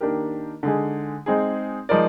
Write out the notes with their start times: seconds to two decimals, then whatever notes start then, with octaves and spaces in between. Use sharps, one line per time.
0.01 D#3 A#3 D4 G4 A#4
0.63 D3 G#3 D#4 G#4
1.26 G#3 C4 D#4 G#4
1.89 F3 G#3 D#4 A#4 D5